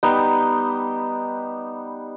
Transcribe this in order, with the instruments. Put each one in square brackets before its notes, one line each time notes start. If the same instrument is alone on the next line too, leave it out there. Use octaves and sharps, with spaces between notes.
[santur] G3 B3 D#4 G5